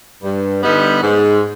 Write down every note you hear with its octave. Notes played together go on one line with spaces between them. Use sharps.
G2
D3 G3 B3 D#4
G#2